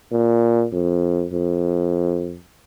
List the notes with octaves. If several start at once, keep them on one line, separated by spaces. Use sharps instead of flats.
A#2
F2
F2